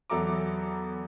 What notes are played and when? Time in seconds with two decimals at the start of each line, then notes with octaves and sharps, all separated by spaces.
0.10 E2 F#3 A4 E5 A#5 D6